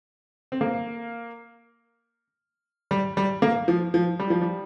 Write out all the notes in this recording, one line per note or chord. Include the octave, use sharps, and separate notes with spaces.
C4
A#3
G3
G3
A#3
F3
F3
G3
F3
G3